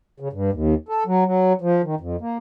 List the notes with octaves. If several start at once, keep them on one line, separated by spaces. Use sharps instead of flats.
C#3
G2
D#2
A4
F#3
F#3
F3
D#3
F2
A#3